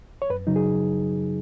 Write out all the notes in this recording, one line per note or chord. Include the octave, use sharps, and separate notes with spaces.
C#5
F#2 B4
C#3 F#3 D#4
G#4